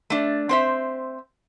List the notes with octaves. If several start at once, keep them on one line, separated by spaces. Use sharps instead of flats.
A3 D4
C4 C5 E5